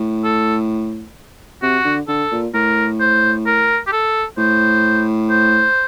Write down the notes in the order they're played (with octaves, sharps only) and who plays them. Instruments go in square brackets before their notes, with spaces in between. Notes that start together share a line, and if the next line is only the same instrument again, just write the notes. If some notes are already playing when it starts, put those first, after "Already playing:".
Already playing: [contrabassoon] A2
[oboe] A4
[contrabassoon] C3 [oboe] F#4
[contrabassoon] D3
[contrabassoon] D3 [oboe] A4
[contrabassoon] A#2
[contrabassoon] A2 [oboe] A#4
[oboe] C5
A#4
G4
A4
[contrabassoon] A2 [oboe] C5
[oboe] C5